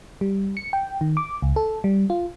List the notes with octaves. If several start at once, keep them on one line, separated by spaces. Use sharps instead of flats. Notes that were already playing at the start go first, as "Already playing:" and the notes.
G3
C#7
G5
D#3
D6
C#2
A4
G3
F4